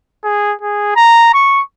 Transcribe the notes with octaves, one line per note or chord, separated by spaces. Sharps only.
G#4
G#4
A#5
C#6